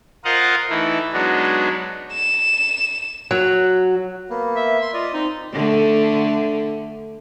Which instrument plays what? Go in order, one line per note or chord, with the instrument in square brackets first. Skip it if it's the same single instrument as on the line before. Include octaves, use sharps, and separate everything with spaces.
[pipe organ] F4 A#4 C5 D#5 F5 F#5
E3 A3 D#4 E4
F#3 G#3 B3 D4 D#4
[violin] E7
[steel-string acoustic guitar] F#3
[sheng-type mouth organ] A#3 B3
[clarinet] E5
[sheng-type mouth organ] C6
[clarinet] F4 [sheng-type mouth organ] D5 D#5
[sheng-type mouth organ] C4 [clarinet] D#4
[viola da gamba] D3 A3